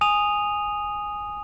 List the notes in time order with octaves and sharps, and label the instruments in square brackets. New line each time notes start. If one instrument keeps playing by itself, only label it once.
[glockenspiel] G#5 D#6 D#7 F7